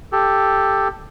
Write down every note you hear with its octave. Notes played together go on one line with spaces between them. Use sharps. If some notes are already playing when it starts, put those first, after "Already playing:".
G4 A4